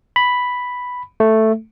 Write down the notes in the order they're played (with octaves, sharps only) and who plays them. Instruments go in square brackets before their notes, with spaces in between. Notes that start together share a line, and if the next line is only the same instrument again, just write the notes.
[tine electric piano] B5
A3